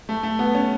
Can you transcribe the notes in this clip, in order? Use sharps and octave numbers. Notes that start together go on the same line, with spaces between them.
A3
A3
B3
C#4